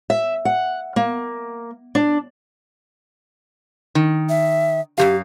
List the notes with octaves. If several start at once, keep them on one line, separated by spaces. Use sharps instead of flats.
E5
F#5
A#3
D4
D#3
E5
F#2 F3 G4 F5